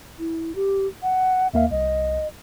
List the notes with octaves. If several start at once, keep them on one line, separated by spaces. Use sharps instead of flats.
E4
G4
F#5
D#2 A#3 E5 F5
C2 D#5